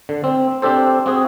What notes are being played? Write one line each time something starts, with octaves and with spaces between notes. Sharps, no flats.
D3
C4
C4 D4 G4 A4 C5
C4 F#4 G#4